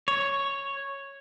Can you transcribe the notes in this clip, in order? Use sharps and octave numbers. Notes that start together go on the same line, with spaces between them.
C#5